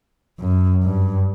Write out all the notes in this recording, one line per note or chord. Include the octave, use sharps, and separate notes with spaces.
F#2
G2